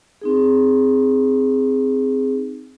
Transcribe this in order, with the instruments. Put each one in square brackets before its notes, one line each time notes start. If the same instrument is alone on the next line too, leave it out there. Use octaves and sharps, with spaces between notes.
[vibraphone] C4 D#4 G#4